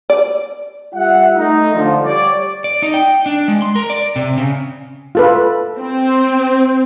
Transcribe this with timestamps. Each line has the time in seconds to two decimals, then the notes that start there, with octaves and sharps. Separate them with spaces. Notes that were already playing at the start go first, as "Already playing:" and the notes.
0.10 D5
0.94 G3 F4 E5 F#5
1.36 A3 D#4
1.74 D3 F3
2.04 G3 C#5 D5
2.64 D5
2.82 D#4
2.94 G5
3.26 D4
3.48 G#3
3.62 C6
3.76 A#4
3.90 D5
4.16 C3
4.38 C#3
5.15 F4 A4 B4
5.78 C4